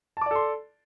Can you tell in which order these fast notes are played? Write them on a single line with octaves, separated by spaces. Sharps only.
A5 D6 D5 A4 C6